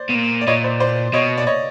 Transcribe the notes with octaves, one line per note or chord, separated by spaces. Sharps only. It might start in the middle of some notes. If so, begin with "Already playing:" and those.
Already playing: C5 D5
B2
A#2
D5
A#2 C#5 D#5
C5 D5
C5 D5
B2 C#5 D#5
D5
C#5 D#5